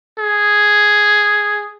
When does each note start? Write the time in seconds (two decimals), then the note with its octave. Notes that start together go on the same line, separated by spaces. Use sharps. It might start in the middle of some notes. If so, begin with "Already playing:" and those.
0.19 G#4